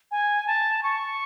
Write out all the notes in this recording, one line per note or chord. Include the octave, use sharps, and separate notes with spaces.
G#5
A5
C#6